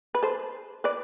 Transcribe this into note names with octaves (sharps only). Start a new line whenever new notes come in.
B4
A4 C5
B4 D5